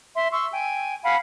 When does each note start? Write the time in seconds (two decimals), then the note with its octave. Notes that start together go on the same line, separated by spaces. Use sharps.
0.14 E5 C6
0.31 C6 C#6 E6
0.52 G5 G#5
1.04 F5 F#5 G#5 B5